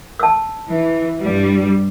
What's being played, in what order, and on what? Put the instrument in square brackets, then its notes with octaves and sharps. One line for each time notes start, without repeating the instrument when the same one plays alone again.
[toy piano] A5 E6
[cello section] E3
G2 G3